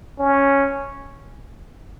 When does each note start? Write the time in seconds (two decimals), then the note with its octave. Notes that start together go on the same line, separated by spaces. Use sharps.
0.18 C#4